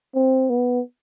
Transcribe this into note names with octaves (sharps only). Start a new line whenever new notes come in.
C4
B3